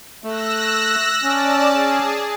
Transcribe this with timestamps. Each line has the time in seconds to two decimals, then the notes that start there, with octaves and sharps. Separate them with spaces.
0.24 A3 E6 F#6 A#6
1.23 C#4 D5 A5
1.71 G#4